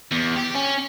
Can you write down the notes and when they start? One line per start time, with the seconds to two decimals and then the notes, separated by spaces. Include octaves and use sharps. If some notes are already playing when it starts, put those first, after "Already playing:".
0.12 E2
0.37 G4
0.55 C#4